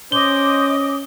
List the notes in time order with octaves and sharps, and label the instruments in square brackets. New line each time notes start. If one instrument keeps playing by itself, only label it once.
[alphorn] C#4 [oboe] C5 [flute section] D#5 D6 D#6 [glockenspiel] G7